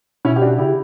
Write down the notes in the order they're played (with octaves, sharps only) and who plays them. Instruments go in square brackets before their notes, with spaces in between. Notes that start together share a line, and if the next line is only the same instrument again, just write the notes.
[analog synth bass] B2 [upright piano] C#4 E4
[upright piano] G4
D4 F#4
[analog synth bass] C#3 [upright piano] E4 G4